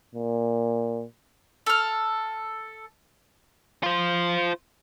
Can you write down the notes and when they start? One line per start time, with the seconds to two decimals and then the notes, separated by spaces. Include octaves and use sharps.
0.15 A#2
1.66 A4 F6
3.83 F4 C5